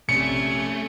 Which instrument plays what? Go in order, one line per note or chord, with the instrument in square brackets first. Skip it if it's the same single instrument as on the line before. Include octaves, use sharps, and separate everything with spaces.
[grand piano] A#1 C3 [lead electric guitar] A3 [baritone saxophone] C#4 [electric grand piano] C#7